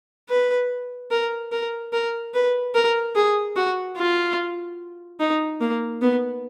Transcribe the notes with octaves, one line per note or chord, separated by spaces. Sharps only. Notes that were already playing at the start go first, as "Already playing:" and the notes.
B4
A#4
A#4
A#4
B4
A#4
G#4
F#4
F4
D#4
A#3
B3